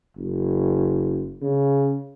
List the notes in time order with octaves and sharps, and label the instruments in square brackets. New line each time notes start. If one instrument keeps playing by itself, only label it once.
[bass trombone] F#1
C#3